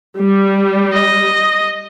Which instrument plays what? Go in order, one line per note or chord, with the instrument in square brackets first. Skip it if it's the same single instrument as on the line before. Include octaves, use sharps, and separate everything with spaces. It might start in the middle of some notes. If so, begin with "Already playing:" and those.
[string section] G3
[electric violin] D#5